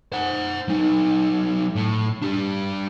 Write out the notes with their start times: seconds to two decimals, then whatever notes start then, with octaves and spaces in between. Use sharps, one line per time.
0.12 C5 F#5
0.68 F#3 D#4
1.75 A2
2.22 D4 G4